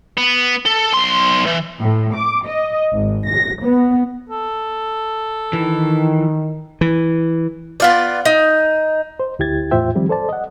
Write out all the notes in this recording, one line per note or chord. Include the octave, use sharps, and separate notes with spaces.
B3
A4
B1 C6
E3
A2
D6
D#5
G#1
A#6
B3
A4
D#3 E3
E3
B3 F4 D5
D#4
C5
D2 E4 G4 G#6 A6
E2 A2 F4 C5 E5 G5
D#3 F3 G3 C4 G4
A4 C5 D5 A5
D#5 F#5